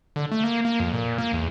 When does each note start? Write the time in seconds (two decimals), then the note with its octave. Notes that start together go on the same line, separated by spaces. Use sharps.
0.16 D3
0.31 A3
0.44 A#3
0.65 A#3
0.80 F2
0.93 A#2
1.18 A#3
1.33 E2